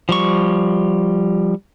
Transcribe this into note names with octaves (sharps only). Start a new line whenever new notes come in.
F3 G3 C#6